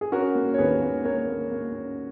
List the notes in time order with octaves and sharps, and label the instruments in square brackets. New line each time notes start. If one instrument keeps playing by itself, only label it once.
[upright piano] G#4
C#4 F#4 A#4
A#3
C#5
D#2 G#4 B4
A#3
A#3 A#4 C#5
A#3
A#3
C#4